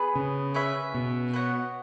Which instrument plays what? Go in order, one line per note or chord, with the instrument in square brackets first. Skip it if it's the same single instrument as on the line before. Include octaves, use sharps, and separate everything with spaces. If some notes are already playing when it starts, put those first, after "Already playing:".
Already playing: [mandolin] B3 G#4 B4
[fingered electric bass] C#3
[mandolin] C#4 G#4 B4 E5
[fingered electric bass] B2
[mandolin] B3 F#4 C#5 F#5